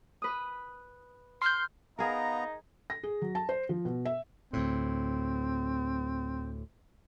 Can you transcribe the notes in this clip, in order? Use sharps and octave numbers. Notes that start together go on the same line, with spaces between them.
B4 D#6
C6 F6 G6
B3 D#4 G#4 A#4 F5 A#5
A#6
G#4
F#3
A5
C5
F3
B2
E5
D2 A2 C4